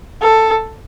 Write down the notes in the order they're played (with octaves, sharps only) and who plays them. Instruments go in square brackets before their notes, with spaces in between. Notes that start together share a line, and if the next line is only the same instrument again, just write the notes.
[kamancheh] A4